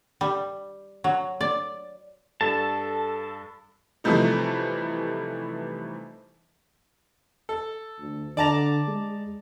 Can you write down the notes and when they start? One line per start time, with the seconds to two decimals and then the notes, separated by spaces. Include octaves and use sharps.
0.21 G3
1.04 F#3
1.41 D5
2.41 G2 A4 A5
4.04 C3 E3 F3 G3 A3 D#4
7.49 A4
8.00 D2
8.37 D3 D5 A5 A#5
8.87 G#3